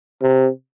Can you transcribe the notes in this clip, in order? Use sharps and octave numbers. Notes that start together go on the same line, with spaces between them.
C3